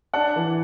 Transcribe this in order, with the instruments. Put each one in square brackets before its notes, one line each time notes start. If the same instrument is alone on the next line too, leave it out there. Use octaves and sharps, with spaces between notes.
[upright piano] D4 F#5 A5
E3